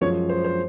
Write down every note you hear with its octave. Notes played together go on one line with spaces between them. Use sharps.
F#2 F3 G#3 C#5
C5
C5